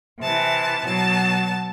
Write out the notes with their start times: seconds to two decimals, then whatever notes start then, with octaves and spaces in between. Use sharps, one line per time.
0.20 C3 E3 A5
0.86 B2 F#3 A5